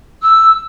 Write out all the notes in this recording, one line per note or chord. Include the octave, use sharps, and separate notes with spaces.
E6